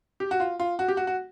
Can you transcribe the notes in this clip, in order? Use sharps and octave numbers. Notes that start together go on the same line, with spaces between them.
G4
F#4
F4
F4
F#4
G4
F#4
F#4